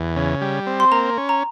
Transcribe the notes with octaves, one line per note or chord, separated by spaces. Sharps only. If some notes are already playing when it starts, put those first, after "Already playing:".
Already playing: E2
C#3
G3
C4
C6
A#3 A#5
C#4
A#5